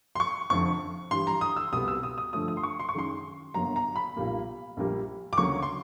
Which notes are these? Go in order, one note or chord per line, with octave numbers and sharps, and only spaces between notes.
C6
C#6
F1 F2 D3 C#6
G2 E3 G3 C6
A#5
D#6
E6
C2 B2 G3 B3 D#6
E6
D#6
D#6
G2 D3 F3 A3 D#6
D#6
C6
C#6
C6
C#6
F#2 D#3 G#3 C6
G1 G2 D3 F#3 A#3 A#5
A#5
B5
B1 A#2 G3 A#3
A#1 A#2 G3 A#3
D6
D2 C#3 F#3 A#3 C#6
C6